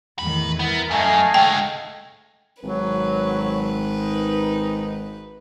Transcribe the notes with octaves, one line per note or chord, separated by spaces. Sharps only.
E2 A2 D#3 B4
B3 E4 A#4
F#2 A3 D#5 F5 G#5
D2 G#3 G5
G#1 F#3 B4
D#4